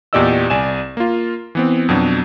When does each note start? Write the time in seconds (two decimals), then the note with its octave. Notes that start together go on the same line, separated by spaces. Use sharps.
0.13 E2 A#2 G4 D5 D#5 E6
0.50 C2 D5 G#5 E7
0.97 A#3 F4
1.55 E3 B3 C4
1.89 F2 B2 F#3 D4